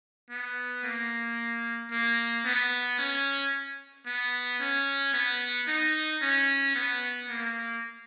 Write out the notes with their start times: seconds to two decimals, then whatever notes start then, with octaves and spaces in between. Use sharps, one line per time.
0.30 B3
0.84 A#3
1.92 A#3
2.45 B3
2.99 C#4
4.07 B3
4.60 C#4
5.14 B3
5.68 D#4
6.22 C#4
6.75 B3
7.29 A#3